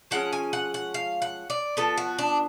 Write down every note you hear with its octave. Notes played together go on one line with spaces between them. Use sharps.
F3 G#3 C#4 F#5
G#5
F#5
F#5
F5
F#5
D5
F3 B3 A4
F#4
D4